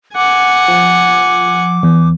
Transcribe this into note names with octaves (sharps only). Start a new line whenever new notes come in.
F#5 G#5 D6
F3
E2